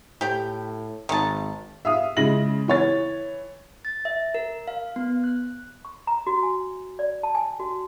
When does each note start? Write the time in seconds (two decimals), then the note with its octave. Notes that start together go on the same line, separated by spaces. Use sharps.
0.21 A2 G4 G5
1.09 G#1 D#3 A5
1.85 E5 F5 D#6
2.17 C#3 G#3 E4 A#6 F#7
2.68 E3 C#5 A6
3.85 A6
4.05 E5
4.34 A#4
4.68 F5
4.96 B3
5.24 F#6
5.85 C#6
6.07 A#5
6.27 F#4
6.43 G#5
6.99 D5
7.23 A5
7.35 G#5
7.60 F#4